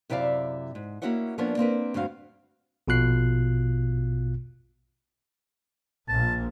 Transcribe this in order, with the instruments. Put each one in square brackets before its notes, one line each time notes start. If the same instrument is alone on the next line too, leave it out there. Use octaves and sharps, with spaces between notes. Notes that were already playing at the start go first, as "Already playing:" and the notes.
[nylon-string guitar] F#2 C3 E4 D5 E5 F5
G#2
A#3 C#4 E4 F#4 C#5 F#5
F3 A#3 B3 C#4 D4 C#5
A#3 C4 A#4 B4
D2 G2 C4 F#4 F5
[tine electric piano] A#1 B2 F4 F#6 C7
[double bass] A#1 A#2 [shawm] A5